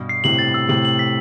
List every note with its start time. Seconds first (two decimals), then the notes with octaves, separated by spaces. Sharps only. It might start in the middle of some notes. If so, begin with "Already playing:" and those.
Already playing: G2 B2
0.09 C7
0.24 A2 C3 F#7
0.39 A6
0.54 E6
0.69 A2 C3 F#7
0.85 F#7
0.99 B6